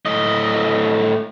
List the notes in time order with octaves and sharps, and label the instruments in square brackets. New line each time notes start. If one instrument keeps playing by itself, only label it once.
[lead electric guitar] A2 D#5